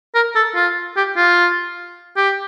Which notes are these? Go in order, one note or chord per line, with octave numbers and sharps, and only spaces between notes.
A#4
A4
F4
G4
F4
G4